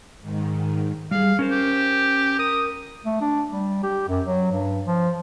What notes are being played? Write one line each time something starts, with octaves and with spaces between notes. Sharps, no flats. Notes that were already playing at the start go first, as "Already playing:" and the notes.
G#2 D#3
G3 G#4 F5
C#4 A#4 C5
G4
A#4 D#6
A3
D4
G3
G4
F#2
F#3
G2
F3